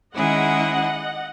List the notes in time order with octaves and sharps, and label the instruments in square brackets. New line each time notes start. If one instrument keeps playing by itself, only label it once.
[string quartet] D#3 G#3 C#4 E4 G#4 [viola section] D#5 F#5